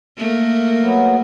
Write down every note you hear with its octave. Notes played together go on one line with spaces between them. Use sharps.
A3 A#3
F#3 B3